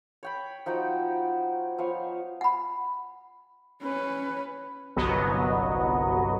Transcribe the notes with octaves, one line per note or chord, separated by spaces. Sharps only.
C#5 G5 B5
F3 D#4 F#4 G5
F3 B3 C#5 F5
F#5 B5
C#4 B4
G1 C2 F#3 B3 D#5